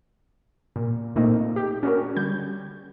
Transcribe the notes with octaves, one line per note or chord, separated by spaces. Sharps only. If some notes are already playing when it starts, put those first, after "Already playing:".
A#2
A#2 A3 A#3 C4 D#4
G4
C#4 D4 F#4 G#4 A#4
D3 G3 G6